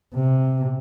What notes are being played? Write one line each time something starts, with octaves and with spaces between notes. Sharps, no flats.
C3